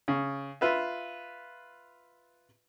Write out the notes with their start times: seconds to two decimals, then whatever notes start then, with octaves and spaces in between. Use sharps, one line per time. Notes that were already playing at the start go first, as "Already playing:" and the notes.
0.08 C#3
0.61 F4 B4 E5